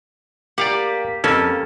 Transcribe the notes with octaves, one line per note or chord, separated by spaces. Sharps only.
A#3 G4 D5 F5 F#5
F2 A#3 C#4 A4